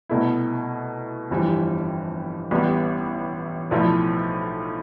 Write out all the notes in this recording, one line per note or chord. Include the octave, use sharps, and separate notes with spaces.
C2 B2 A3 E4
G1 F2 E3 G3
A1 A2 G3 B3
B1 A2 F3 A3 E4